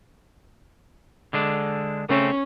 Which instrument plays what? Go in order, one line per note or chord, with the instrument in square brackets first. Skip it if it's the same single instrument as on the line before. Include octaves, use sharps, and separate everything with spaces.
[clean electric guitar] D3 G#3 D4
[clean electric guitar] C#3 A3 C4 [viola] C#4